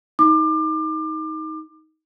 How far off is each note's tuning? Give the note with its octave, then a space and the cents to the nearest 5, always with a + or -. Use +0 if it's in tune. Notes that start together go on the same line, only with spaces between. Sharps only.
D#4 +20 D6 +30